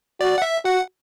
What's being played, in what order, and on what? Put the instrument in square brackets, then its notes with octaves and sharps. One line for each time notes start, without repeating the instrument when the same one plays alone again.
[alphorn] F#4 [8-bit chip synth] D5
[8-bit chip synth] F#5
E5
[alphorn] F#4 [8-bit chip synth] F#5